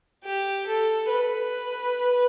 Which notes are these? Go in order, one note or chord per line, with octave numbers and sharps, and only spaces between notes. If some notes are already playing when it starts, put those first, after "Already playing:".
G4
A4
B4